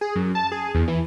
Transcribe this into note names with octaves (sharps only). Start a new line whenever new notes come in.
G#4
F#2
A5
G#4
E2
E3